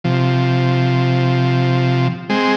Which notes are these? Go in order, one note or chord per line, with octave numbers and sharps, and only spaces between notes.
C3 F3
G#3 C4